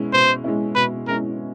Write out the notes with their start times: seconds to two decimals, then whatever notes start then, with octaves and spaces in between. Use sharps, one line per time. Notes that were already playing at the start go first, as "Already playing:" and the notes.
Already playing: B2 G#3 C#4 E4
0.13 B2 C5
0.44 G#3 C#4 E4
0.75 B2 B4
1.07 G#3 C#4 E4 A#4